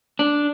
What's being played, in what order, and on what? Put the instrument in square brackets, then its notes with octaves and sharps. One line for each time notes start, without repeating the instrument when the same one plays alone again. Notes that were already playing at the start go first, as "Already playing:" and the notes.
[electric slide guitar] D4